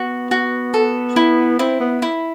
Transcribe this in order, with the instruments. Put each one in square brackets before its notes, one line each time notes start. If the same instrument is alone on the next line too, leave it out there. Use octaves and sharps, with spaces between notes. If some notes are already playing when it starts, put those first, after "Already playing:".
Already playing: [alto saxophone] B3 [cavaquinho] F#4
[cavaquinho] F#4
A4
E4
[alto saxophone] C4 [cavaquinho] E4
[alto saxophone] B3
[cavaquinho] E4